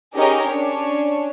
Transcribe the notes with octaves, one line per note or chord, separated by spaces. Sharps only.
C#4 D#4 G4 G#4 A#4 D#5
C#4 D4 C#5